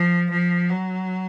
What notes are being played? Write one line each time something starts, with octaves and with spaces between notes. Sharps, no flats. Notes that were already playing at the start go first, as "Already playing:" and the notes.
Already playing: F3
F3
F#3